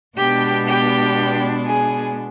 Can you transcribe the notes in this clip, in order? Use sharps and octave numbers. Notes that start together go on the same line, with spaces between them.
B2 G#3 B3 D4 G4 G5
G4 G5
G#4 G#5